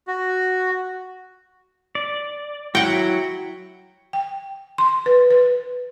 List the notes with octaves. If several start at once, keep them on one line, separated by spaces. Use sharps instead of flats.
F#4
D5
F#3 E4 F#4 F#5 G5
G5
C6
B4
B4